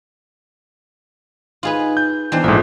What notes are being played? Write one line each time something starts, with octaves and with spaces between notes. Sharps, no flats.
D#4 F4 G#4 B4 D#5
G6
E3 B3 D4 C5 D#5 G5
A#1 G#2 F4 A4 D#6